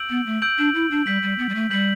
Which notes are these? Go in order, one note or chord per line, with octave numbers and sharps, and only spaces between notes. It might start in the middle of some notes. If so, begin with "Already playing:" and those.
Already playing: E6 G6 D7 F#7
B3
A3
E6 G6 D7 F#7
D4
E4
D4
G3 G6 B6 F#7
G3
B3
G3
A3
G3 G6 B6 F#7